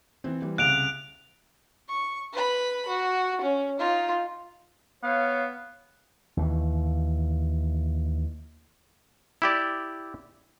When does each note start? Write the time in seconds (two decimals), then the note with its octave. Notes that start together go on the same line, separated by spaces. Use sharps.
0.24 E3 C4
0.42 E3 G3
0.58 C2 C#3 F#6 D7 F7
1.89 C#6
2.33 B4 B5
2.89 F#4
3.41 C#4
3.79 D#4 F4
5.03 B3 C#5 F5
6.37 D#2 E3
9.42 E4 G4 D5